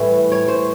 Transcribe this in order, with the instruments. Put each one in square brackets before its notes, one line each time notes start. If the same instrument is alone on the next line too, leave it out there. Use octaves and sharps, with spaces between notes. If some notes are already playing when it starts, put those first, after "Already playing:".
Already playing: [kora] A2 E3 G3 C#5
C#5
C5